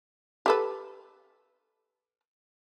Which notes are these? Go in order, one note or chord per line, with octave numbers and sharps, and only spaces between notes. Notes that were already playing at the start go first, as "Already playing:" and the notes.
G4 A4 B4